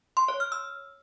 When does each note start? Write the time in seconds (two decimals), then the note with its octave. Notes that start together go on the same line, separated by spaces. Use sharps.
0.17 C6
0.28 C#5
0.40 F6
0.52 E6